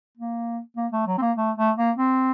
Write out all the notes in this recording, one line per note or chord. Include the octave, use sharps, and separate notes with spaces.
A#3
A#3
A3
F#3
C4
A#3
A3
A3
A#3
C4